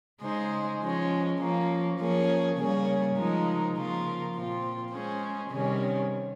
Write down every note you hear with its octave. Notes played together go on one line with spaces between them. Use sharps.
C#3 G#3 D#4 G#4 C5
F3 G#3 C#4
F3 A#3 C#4
F3 A#3 C#4 G#4
C#3 G3 A#3 C#4 G#4
C#3 F3 G#3 D#4 A#4
C#3 F3 A#3 F4 A#4
A#2 F3 C4 F4
G#3 C#4 G#4 C5
C3 D#3 G3 C#4 G#4